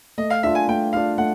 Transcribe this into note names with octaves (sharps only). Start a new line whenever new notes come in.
A3 D#5
F5
D4 F4 E5
G#5
A3 G5
D4 F4 F5
A3 F#5